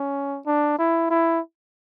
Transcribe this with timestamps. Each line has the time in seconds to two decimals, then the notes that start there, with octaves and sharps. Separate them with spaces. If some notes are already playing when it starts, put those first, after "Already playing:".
Already playing: C#4
0.46 D4
0.79 E4
1.11 E4